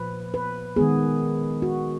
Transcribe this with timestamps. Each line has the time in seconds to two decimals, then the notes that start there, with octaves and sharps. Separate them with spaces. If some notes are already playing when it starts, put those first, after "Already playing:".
Already playing: A#2 F3 B4
0.34 B4
0.76 D#3 G#3 B3 G#4
1.62 F#4